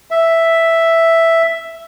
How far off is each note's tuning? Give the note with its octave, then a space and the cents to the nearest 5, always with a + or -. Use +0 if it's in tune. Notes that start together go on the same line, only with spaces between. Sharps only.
E5 +0